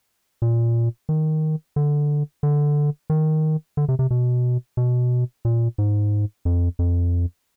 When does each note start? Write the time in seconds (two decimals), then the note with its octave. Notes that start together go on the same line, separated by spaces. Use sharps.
0.42 A#2
1.09 D#3
1.76 D3
2.43 D3
3.10 D#3
3.77 D3
3.89 C3
3.99 C3
4.11 B2
4.77 B2
5.45 A#2
5.78 G#2
6.45 F2
6.79 F2